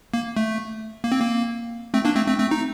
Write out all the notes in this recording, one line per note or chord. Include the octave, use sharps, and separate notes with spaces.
A#3
A3
A#3
C4
A#3
A3 C4
A#3 D4
A3 C4
A3 C4
A3 C4
D#4